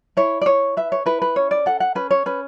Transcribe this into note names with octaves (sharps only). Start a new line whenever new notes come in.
E4 C#5
D5
E4 C#5
B4 E5
C#5
E4 B4
B4
C#4 C#5
D5
A4 F#5
F#5
C#4 B4
C#5
C#4 B4